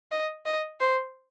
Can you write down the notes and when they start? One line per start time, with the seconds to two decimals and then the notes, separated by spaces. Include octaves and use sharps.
0.11 D#5
0.45 D#5
0.80 C5